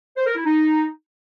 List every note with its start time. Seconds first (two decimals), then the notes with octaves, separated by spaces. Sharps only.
0.17 C5
0.26 A#4
0.36 E4
0.45 D#4